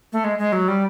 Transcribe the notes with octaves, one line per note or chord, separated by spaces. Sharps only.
A3
G#3
G#3
F#3
G3